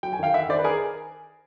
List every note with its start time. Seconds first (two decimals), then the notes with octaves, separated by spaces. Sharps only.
0.03 F#3 G5
0.13 G#5
0.19 D#3 F5 G5
0.34 D#3 E5 F#5
0.49 D#3 C5 D5
0.59 B4
0.64 G#4 A#4